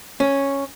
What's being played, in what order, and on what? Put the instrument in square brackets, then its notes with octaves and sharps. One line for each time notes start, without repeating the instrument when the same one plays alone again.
[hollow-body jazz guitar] C#4